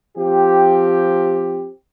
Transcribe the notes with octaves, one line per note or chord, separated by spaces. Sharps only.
F3 C4 G4